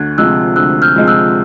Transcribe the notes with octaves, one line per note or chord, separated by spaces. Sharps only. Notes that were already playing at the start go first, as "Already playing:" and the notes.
Already playing: D2 F#6 G#6
C3 F3 G#3 E6 F#6
D2 E6 F#6
F6 G6
C3 F3 G#3
E6 F#6